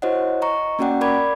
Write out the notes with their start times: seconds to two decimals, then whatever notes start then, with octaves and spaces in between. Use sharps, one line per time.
0.02 E4 F#4 C5 C#5 D#5 F#5
0.42 D#5 A#5 C#6
0.79 A#3 C#4 F#4 D5 F#5 G5
1.01 A#4 D5 B5 D6 G#6